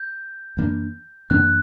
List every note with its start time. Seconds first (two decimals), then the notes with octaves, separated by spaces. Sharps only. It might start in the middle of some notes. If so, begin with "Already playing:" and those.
Already playing: G6
0.57 F#2 E3 A#3 D4
1.30 F#2 E3 A#3 D4 F#6